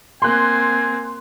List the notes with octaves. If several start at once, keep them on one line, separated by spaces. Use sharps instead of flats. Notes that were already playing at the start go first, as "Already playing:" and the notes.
A#3 C4 G#5 C6 F#6